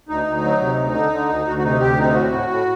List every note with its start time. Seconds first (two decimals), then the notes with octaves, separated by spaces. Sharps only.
0.09 D2 D#4
0.26 D2
0.44 F#3
0.61 C3
0.78 D2
0.95 D3
1.12 D3
1.29 D2
1.47 D2 F#4
1.58 F#4
1.64 C3 D#4
1.81 D2 G4
1.98 C3 D#4
2.14 A2 F#4
2.32 A2
2.50 A2